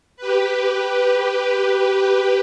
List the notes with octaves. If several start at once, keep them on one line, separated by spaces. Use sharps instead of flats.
G4 B4